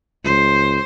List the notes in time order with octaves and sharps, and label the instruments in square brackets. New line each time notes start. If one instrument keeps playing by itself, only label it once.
[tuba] C#2 [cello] C5